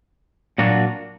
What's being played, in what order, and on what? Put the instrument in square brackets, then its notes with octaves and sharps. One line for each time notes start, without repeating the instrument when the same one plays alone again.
[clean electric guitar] A#2 F#3 A#3 D4 F#4